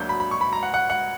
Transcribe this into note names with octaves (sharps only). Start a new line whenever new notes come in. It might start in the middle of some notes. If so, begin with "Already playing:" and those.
Already playing: D2 D3 F#3 A#3 G6
B5
B5
C#6
B5
A#5
F#5
F#5
F#5